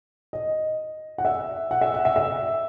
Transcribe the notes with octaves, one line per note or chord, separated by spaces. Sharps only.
D#5
F#5
E5
F#5
E5
F#5
E5
E5